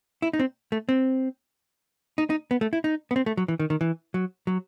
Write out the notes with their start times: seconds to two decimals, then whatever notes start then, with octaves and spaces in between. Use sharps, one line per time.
0.22 E4
0.33 D#4
0.39 C4
0.72 A3
0.89 C4
2.18 D#4
2.30 D#4
2.51 B3
2.61 A3
2.73 E4
2.84 D#4
3.11 B3
3.16 C4
3.26 A3
3.37 F#3
3.48 E3
3.59 D#3
3.70 D#3
3.81 E3
4.14 F#3
4.47 F#3